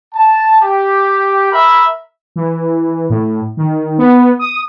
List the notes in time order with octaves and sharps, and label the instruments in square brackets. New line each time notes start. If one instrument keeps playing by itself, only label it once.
[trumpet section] A5
G4
A#4 E5 B5
[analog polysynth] E3
A2
D#3
B3
D#6